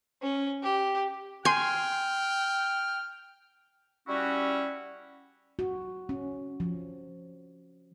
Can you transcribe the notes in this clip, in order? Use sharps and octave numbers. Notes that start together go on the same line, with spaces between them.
C#4
G4
G5 G#5 C6 F6 G6
G3 C#4 E4 F#4
F#4
C#4
F3